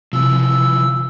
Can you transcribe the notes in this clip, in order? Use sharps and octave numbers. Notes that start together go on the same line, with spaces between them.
C3 E3 F3 E6